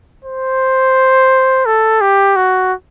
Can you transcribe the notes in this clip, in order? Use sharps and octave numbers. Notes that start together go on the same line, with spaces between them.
C5
A4
G4
F#4